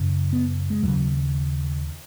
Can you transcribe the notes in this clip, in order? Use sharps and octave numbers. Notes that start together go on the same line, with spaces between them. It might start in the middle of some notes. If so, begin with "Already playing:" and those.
Already playing: F#2 C#3
B3
G#3
D#2 C#3 F#3